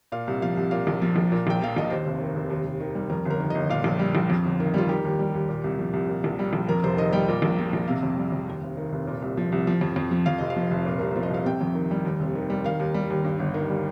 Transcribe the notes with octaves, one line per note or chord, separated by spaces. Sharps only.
A#2 F5
C2
F3 F5
C2
A#2 F5
A#1
F3
A#1
A#2
A#1 G5
F3 F5
A#1 D#5
D#2 C5
F1
D#3
F1
D#2
F1
D#3
G3
F2 A#4
G1 A#4
D#3
G1 D#5
A#2 F5
A#1
G3
A#1
F2
G1
D#3
G3 F4
D#3 G4
D#2
G3
D#2
A#2
C2
F3
C2
A#2
A#1
G3
A#1
F2 A#4
F1 C5
D#3 D#5
G3 G5
A#2
A#1
F3
A#1
C3 F5
F2
G3
F2
D#2
F1
D#3
F1
A#2
C2
F3
C2
F3
F2
F2
F3
F2 F5
F1 D#5
F5
F3
F1
A#2
C2 A#4
F3 C5
D#5
C2 F5
C3 G5
F2
D#3
G3
D#2
F1
D#3
G3
D#3 F5
D#2
G3
D#2
G2
G1
D#3
G3